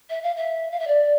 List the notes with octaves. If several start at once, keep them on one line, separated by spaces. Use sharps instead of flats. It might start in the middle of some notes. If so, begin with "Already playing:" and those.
E5
F5
E5
F5
E5
D5